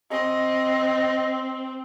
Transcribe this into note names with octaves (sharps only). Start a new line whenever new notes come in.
C4 D#5